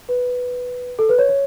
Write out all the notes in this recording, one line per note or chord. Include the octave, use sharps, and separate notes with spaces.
B4
A4
B4
C#5
C#5